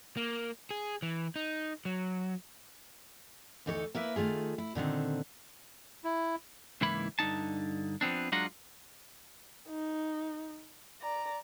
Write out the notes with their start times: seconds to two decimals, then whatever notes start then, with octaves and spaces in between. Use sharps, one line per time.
0.17 A#3
0.71 G#4
1.02 E3
1.36 D#4
1.85 F#3
3.66 D2 E3 D#4 A4 B4 C#5
3.95 A#3 E4 B4 E5
4.16 D#3 A3 F4 G#4
4.58 E4
4.75 A#2 D3 D#3 C4
6.04 E4
6.81 C#2 G#2 E3 A#3 E4 B5
7.19 G2 D3 D#4 A5
8.01 F3 B3 C4 D4
8.32 F#3 G#3 D4 F4 F#5 A#5
9.68 D#4
11.02 D5 A#5